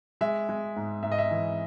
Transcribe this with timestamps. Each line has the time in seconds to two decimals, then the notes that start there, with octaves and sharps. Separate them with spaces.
0.21 G#3 E5
0.49 G#3
0.76 G#2
1.03 G#2 E5
1.12 D#5
1.18 E5
1.31 E3